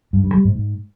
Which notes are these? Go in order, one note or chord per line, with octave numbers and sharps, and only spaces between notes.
G2
G2
G3
G#2
G#2